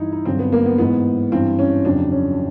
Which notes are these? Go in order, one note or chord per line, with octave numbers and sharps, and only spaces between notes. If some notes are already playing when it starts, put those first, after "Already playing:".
Already playing: G2 E3 D#4 E4
D#4
G2 D3 F#3 C4
B3
A#3
B3
G#2 E3 B3
G2 E3 C4
C#4
F2 C#3 F#3 D4
C#4